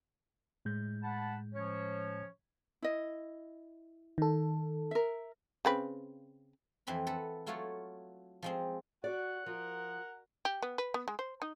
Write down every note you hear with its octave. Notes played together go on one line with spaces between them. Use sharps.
A2 G#3 G6
F#5 A5 B5
F3 C#4 C#5
E4 D#5
D#3 A4
A#4 E5
C#3 C4 B4
F2 E3 C4 B4 B5
A4 B4 F#5
F#3 A3 F4 A4 C#5 F#5
F3 G#3 C4
F#4 D5 F#5
F3 A#4
G4
B3
B4
B3
G#3
C5
D#4